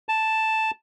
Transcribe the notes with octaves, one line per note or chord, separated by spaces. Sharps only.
A5